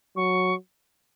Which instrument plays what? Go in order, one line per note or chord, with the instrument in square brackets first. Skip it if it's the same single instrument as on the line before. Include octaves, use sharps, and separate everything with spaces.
[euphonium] F#3 [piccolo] C#6